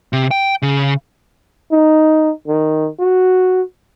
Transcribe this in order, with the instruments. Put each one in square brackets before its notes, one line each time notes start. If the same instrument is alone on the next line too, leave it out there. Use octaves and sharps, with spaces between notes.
[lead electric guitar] C3
G5
C#3
[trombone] D#4
D#3
F#4